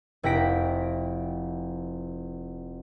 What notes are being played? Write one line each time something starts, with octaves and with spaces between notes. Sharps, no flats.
F1 E4 G5 A#6 B6 D7